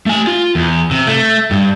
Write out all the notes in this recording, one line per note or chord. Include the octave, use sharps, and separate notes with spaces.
A3 G#5
F4
E2
C3
A3
G2